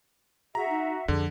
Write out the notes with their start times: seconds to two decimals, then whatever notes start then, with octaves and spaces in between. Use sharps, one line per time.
0.55 F#4 G#4 E5 A#5
0.69 D#4
1.08 F2 D3 G#4